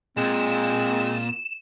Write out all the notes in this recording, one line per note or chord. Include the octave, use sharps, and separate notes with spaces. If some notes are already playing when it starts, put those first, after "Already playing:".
A#2 G#3 C4 E7